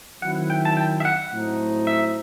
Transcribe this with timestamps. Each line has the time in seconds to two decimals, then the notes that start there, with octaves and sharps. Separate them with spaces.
0.22 D#3 F#3 C4 E4 F#5
0.50 G5
0.65 A5
0.77 G5
1.00 E5
1.05 F#5
1.32 A2 F#3 A3 C4 D#4
1.87 E5